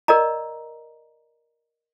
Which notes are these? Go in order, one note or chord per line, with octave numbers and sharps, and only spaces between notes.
A#4 D5 D#5 A#5